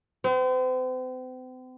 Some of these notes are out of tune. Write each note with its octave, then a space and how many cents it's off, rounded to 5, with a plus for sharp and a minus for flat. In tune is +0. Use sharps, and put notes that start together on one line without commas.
C4 -40